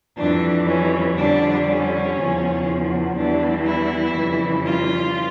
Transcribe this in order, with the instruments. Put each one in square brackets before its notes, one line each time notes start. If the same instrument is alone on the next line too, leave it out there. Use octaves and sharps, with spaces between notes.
[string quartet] F2 E3 G3 D4
C#4
F2 D3 G3 D4
C#4
E2 C#3 F3
E2 E3 G3 D4
E4
F2 C#3 E3 G3
F4